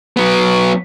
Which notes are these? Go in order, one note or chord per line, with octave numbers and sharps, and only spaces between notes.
F#3 B3